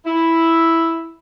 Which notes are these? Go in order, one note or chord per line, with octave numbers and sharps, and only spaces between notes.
E4